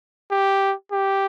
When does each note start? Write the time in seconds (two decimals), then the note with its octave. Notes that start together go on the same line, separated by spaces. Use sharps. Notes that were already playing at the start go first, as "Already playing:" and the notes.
0.32 G4
0.92 G4